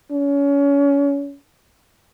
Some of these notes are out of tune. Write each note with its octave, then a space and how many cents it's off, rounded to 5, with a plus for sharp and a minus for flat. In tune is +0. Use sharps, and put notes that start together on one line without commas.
C#4 +30